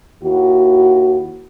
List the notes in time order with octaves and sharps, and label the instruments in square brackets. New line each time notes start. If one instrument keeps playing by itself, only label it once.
[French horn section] D#2 E4 F#4